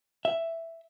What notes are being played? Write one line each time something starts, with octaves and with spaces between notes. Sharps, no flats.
E5